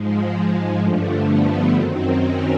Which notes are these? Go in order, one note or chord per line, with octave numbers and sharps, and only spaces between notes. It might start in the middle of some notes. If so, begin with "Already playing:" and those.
Already playing: G#2 F3 G#3
G#3
G2 D3 F3 A3
B3
F#2 D#3 F#3 C4
C#4